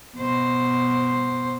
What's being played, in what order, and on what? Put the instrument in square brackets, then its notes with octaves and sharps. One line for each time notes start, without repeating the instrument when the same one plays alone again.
[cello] B2 C5